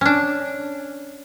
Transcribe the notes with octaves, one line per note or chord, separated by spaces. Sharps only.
C#4 D4